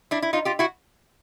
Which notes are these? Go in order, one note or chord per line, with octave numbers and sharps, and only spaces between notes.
D4 E4
E4
D#4 F4
F4 G4
E4 F#4